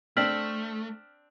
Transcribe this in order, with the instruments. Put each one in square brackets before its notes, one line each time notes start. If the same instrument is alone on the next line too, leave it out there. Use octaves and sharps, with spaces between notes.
[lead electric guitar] A3 [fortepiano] C4 D4 [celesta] F6 B6 F#7